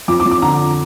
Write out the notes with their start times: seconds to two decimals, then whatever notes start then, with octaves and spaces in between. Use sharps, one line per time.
0.08 F2 D6
0.20 D6
0.26 F2
0.31 D6
0.42 D3 A#5